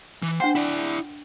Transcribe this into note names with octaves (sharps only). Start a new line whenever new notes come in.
E3
D4 C5 F#5 G5
E4 D5